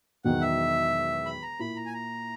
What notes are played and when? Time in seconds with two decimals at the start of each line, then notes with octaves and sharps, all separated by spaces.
0.25 E1 E2 D#3 F#3 F#5
0.41 E5
1.26 B5
1.42 A#5
1.59 A#2 A#3 E4 B5
1.76 A#5
1.86 G#5
1.93 A#5